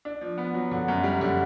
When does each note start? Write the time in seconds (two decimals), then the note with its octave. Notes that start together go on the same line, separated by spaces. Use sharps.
0.05 D4
0.21 F3
0.38 B3
0.54 F#3
0.71 D3
0.88 F#2
1.03 G3
1.21 D3